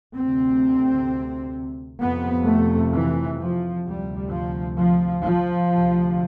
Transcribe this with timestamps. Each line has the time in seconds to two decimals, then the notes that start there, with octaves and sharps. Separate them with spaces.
0.16 D2 C3 C4
2.00 F2 C3 B3
2.46 A3
2.93 E3
3.39 F3
3.85 D2 C3 G3
4.31 F3
4.77 F3
5.24 F3
5.70 D2 C3